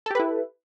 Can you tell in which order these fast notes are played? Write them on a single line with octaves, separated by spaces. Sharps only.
A4 G4 B4 E4